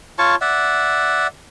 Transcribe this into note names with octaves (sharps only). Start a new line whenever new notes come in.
F4 C#5 A5 C#6
D5 E5 F#5